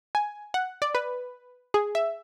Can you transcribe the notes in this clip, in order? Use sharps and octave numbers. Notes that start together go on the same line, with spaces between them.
G#5
F#5
D5
B4
G#4
E5